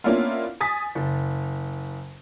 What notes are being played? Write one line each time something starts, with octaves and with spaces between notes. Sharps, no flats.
A#3 B3 C#4 D4 E4 F4
G#5 D#6 A6 B6
F#1